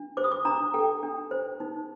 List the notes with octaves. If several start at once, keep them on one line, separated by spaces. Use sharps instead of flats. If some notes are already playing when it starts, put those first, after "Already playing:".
Already playing: D4
C5 D6
D#6
D6
D4 A#5
A4 G5
D4
C5
D#4